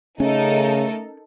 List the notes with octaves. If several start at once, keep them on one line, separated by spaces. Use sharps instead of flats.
C#3 A3 C#4 D#4 A4 A#4